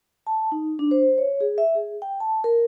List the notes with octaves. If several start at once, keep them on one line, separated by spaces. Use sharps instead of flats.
A5
D#4
D4
C5
C#5
G#4
E5
G#4
G5
A5
A#4